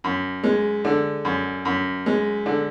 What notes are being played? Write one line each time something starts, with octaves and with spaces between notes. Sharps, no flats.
F#2
G#3
D3
F#2
F#2
G#3
D3